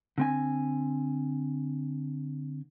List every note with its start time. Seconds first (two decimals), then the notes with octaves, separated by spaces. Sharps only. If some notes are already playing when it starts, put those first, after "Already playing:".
0.18 D3 C4 G#5